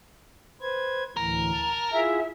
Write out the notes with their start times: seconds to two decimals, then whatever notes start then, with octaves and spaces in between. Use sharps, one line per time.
0.61 B4 C5 G#6
1.17 D2 A2 E3 A#4
1.53 A5
1.92 E4 F4 G#4 E5